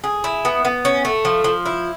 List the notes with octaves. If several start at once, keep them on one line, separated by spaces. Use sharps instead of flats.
G#4
E4
B3
B3
C#4
A3
F3
F3
E4